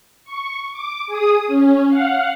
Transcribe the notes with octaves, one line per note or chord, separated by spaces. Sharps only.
C#6
D6
G#4 D#6
C#4
F5 F#5